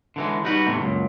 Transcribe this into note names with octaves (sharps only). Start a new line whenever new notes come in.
D3 E3 G#3
G3 D#4 F#4 B4
E2 A2 C3 E3
C#2 F#2 A#2